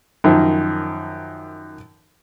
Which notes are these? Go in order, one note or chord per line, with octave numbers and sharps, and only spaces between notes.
F#2 D#3 F3